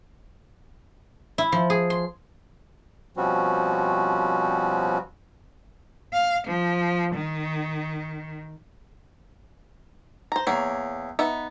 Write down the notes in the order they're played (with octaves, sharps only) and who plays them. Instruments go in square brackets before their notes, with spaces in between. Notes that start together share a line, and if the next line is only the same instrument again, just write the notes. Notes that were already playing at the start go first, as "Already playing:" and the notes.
[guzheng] E4
F3
G#4
C6
[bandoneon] B2 F3 G3 C4 C#4 F#4
[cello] F5
F3
D#3
[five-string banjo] C5 A#5
[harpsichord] E2 [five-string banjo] A#3 C#5
[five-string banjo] B3 D#4 E5